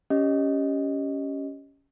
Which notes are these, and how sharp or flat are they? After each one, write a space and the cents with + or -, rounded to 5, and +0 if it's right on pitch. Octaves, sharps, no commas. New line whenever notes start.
C#4 +10 G4 +0 D#5 +0